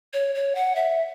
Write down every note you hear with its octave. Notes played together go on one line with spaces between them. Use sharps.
C#5
C#5
F#5
E5